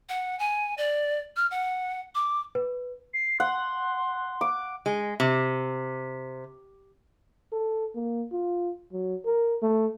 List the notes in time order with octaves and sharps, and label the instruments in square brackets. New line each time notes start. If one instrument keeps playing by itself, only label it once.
[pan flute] F#5
G#5
D5
F6
F#5
D6
[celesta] B4
[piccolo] C7
[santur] F#5 [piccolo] C6
[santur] D6
[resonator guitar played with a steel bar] G#3
C3
[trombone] A4
A#3
F4
F#3
A#4
A3